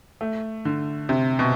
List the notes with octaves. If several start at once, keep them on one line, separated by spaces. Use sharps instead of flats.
A3
D3
C3
B2